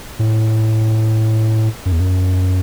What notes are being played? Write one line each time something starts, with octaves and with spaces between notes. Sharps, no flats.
A2
F#2
E2
F#2